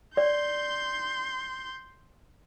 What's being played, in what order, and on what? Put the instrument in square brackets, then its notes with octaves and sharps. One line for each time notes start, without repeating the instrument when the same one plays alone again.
[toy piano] D5 [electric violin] C6 G6